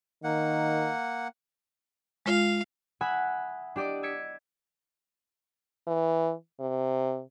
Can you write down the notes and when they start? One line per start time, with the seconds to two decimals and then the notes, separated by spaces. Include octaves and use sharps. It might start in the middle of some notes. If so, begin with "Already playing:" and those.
0.24 D#3 A#3 F#5
2.26 G#3 F4 F5
3.01 E5 F#5 G#5 B5 D#6 F#6
3.76 D4 G4 D5 D#5 D6
4.03 E6 G#6 B6 C#7 D7
5.87 E3
6.60 C3